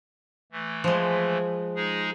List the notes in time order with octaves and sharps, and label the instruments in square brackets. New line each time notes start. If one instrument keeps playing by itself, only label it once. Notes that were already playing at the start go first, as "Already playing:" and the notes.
[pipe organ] E3 A3
[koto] F3 G#3
[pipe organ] G#3 D#4 G#4